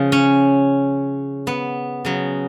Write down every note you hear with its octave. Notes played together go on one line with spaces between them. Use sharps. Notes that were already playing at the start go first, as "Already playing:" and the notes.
Already playing: C#3 F3
C#4
B3
C#3 F#3